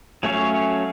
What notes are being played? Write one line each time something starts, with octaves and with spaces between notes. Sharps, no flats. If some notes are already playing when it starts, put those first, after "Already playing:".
F#3 A3 C#4 C#5 F5